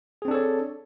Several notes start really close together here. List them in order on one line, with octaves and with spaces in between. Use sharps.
G#4 C4 D4 A4 C#5